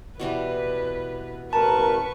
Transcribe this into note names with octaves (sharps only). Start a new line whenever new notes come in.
B2 E3 G3 B4
A1 A#4 B4 A5 C#6